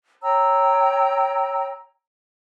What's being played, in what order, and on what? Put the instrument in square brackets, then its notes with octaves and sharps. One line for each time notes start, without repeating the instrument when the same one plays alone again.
[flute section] C#5 G5 A#5 E6